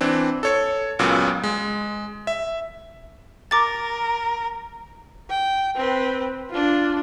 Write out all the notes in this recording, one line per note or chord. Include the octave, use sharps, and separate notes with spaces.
E3 C4 D4
A4 C#5 C#7
C#2 A#2 C#3 F#3 B3
G#3
E5
A#4 D6 A6
G5
C4 B4
D4 F4